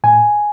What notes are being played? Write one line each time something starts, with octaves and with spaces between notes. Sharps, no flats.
A2 G#5